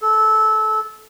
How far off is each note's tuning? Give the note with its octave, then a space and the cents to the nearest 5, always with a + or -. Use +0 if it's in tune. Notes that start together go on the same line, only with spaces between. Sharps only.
A4 -20